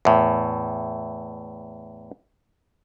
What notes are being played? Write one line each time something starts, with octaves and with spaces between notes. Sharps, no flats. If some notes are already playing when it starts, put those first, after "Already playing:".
E2 A2